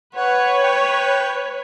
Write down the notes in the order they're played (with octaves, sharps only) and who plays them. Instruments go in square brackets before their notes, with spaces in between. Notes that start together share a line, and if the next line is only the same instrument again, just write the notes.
[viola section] B4 C#5 [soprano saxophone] F#5
[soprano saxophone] G5